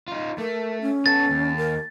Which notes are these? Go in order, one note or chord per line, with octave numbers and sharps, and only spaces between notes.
D#4 F4
A3 A#4
C#4
B3 A4 A6
D#2
A#4